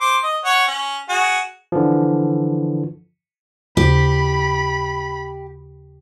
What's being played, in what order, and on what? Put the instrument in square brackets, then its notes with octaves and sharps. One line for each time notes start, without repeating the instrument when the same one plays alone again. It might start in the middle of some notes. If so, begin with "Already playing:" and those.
[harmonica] C5 C6 D6
D#5
C#5 F#5
C#4
F#4 G#4
[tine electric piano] D3 E3 F3
[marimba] D#2 C#3 [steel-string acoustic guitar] G4 [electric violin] B5